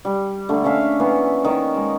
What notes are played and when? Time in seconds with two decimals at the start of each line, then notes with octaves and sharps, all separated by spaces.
0.05 G3
0.48 D3 A3 A#3
0.64 C#4 D4 E5 F5
1.00 E3 A#3 B3
1.45 D#3 C#5
1.76 G#3